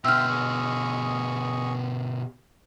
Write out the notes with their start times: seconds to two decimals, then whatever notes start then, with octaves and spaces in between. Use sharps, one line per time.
0.05 B2 D3 E5 G5 C6 E6 F6
0.29 G#4 D#5 C#6